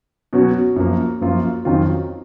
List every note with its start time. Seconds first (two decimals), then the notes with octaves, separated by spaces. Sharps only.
0.33 B2 F#3 C#4 F#4 C#5
0.76 F#2 F3 A#3
1.21 F#2 F3 A#3 F4
1.65 F2 D#3 F#3 C#4 F4